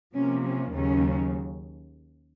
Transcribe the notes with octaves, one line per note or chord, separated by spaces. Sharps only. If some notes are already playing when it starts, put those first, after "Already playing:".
C3 F3 A#3 C#4
C#4
D#2 C#3 F#3 C#4